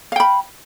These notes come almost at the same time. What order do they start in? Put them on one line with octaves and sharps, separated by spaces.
F5 G5 B5